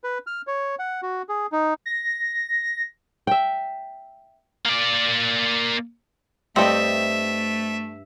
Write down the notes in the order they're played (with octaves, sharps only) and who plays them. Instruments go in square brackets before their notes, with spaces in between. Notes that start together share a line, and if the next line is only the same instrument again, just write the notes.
[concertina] B4
F6
C#5
F#5
F#4
G#4
D#4
[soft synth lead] A#6
[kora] E5 G5
[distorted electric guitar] A#3 D5
[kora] G2 D#5 G5 [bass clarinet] A3 [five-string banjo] C4 A4 [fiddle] E5